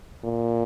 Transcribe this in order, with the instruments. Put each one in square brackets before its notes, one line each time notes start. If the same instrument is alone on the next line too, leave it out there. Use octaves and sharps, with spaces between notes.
[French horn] A#2